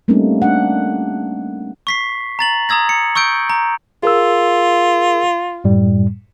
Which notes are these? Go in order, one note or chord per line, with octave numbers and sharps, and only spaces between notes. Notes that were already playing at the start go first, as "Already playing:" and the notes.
G3 A3 A#3 C4 C#4 D#4
D4 F#5
C#6 B6 C7
A#5 A6 F#7
A#5 D#6 E6 G#6 A#6
C#7
C#6 E6 G6 D7
A#5
F4 G#4 A#4 E6
F#2 A2 G3